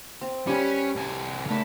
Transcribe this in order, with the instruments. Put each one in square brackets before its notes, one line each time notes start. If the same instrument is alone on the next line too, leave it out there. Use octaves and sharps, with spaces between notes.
[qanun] C4
[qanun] G3 G4 B4 [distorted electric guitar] C#4
[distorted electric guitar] C2 G#5
[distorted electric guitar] C#3 A3 [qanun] A#4 A5 B5